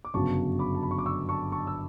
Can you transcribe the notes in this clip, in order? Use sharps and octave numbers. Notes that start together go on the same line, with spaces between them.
D6
G1 F#2 C#3 F#3 B3 A5 C#6
B5 D6
A5
B5
C#6
D6
C#6 E6
A5 C#6
A5 C#6
E6